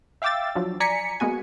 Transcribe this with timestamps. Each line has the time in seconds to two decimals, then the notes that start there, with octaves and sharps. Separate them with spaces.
0.22 E5 F5 G5 D6 E6 A6
0.55 F3 F#3 D4
0.80 D5 G#5 A#5 B6 C#7
1.20 G#3 A#3 B3 F#4 G#5